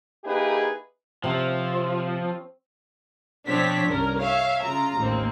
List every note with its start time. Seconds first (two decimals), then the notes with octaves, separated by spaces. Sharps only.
0.24 A#3 D#4 E4 G4 G#4 B4
1.24 C3 F3 C4 C#5 G5
3.47 B2 F3 C4 D4 C#5 B6
3.88 C2 G2 C#4 A#4
4.19 C#5 E5 F5
4.63 C#3 F4 A#5
4.97 A1 D#2 A#3 C4